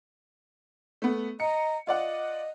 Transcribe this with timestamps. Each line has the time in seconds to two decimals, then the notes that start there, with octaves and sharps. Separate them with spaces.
1.02 A3 B3
1.40 D#5 A#5 C#7
1.87 F4 D5 D#5 F#5